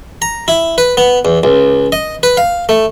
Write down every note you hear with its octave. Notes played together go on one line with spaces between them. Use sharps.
A#5
E4
B4
B3
E2
C#2
D#5
B4
F5
A3